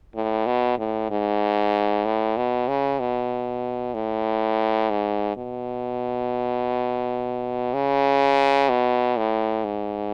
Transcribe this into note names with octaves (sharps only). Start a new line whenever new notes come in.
A2
B2
A2
G#2
A2
B2
C#3
B2
A2
G#2
B2
C#3
B2
A2
G#2